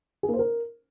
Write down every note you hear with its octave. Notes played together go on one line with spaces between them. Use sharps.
G#4
A#3
C5
A#4